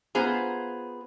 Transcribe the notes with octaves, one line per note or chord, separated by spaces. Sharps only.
B3 F4 G#4 C5 A#5